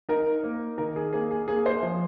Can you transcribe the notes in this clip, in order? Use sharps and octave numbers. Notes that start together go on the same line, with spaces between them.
D#4 A#4
A#3
D#3 A#4
G#4
A#3 G#4
G#4
A#3 G#4
C5
F3